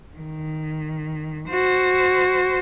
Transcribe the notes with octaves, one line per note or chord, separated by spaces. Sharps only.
D#3
F#4 C5